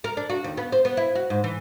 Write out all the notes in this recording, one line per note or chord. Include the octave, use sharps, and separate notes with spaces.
A#4
D4
F#4
D#2
B3
C5
B3
E4
F#4
G#2
E3